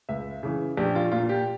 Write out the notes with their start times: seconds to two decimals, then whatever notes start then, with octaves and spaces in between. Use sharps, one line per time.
0.09 C#2 E5
0.43 C#3 E3
0.77 A#1 G4
0.95 F4
1.12 A#2 F4
1.29 G4